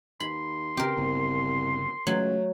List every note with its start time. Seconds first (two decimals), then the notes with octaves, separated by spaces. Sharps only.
0.20 D#2 B5 C6
0.77 C#3 C4 G4 A#4
0.97 G1 C2 C#3 B3
2.07 C#2 F#3 A3